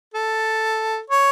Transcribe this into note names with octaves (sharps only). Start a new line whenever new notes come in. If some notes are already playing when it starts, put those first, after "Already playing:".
A4
C#5